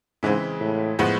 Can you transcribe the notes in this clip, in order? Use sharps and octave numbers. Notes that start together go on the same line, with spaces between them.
G#2 C#3 E3 G#3 C4
A2
A2 F3 G#3 B3